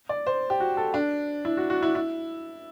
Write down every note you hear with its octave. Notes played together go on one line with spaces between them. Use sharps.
D5
C5
G4
F#4
A4
D4
E4
F#4
F#4
E4
E4